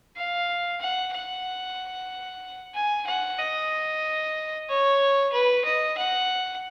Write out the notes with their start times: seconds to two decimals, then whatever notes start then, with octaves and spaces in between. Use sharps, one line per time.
0.16 F5
0.81 F#5
1.14 F#5
2.74 G#5
3.07 F#5
3.39 D#5
4.69 C#5
5.33 B4
5.65 D#5
5.98 F#5